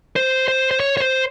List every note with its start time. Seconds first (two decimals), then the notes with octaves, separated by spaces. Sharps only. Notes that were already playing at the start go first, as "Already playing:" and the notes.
0.16 C5
0.48 C5
0.71 C5
0.80 C#5
0.97 C#5
1.02 C5